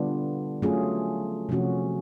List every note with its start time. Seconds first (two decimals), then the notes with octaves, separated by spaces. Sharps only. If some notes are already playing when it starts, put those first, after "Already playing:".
Already playing: D3 G3 B3 D4 F4
0.62 F#3 A3 C#4 F4 G#4
1.49 C3 F3 A3 C#4 F#4